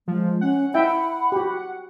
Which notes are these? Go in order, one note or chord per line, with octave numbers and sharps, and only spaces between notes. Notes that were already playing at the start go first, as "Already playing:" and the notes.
F3 G#3
C#4 F#5
E4 E5 G5 B5
F#4 G4